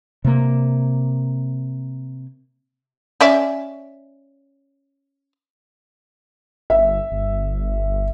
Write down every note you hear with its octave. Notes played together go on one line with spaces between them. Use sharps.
C3 A#3
C#4 D5 E5
G1 E5
G1